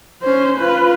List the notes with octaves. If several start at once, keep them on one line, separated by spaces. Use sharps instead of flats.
C#4 C5
F4 B4